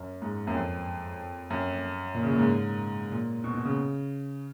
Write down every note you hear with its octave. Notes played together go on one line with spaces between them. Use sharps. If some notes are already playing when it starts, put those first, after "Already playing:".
Already playing: F#2
G#2
F#2
F2
F#2
A#2
C#3
A#2
G#2
A#2
B2
B2
C#3